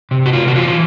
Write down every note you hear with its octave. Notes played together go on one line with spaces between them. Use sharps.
C3
F#4
C3 F4
F#4
E3 F4